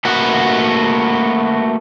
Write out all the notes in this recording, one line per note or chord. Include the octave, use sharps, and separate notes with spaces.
A3 A#3 F#4 B4 F#5